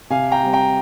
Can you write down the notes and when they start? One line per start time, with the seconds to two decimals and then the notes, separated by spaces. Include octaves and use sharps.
0.10 C3 F5 G#5
0.32 G5 A#5
0.43 G3 C4
0.53 G5 A#5